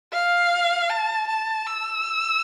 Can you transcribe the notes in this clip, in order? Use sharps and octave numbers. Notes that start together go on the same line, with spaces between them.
F5
A5
A5
E6